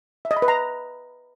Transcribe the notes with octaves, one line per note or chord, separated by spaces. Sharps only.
E5
D#5
B5
B4
A#5